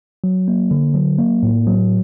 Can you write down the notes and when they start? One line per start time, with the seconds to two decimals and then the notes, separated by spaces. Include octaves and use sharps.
0.24 F#3
0.48 A#3
0.71 D3
0.94 F#3
1.18 A#3
1.43 A2
1.67 F#3